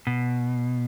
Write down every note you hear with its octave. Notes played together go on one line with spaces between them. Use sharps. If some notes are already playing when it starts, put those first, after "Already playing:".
B2